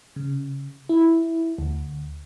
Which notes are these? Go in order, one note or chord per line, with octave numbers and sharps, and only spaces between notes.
C#3
E4
D2